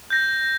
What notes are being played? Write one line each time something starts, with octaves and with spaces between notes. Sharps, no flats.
G6 A#6